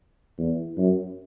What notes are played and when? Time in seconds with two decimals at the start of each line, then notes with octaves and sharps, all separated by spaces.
0.39 E2
0.77 F#2